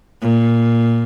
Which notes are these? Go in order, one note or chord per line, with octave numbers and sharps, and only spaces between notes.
A#2